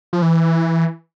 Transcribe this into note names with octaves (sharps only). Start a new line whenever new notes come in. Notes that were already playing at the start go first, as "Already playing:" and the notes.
F3
E3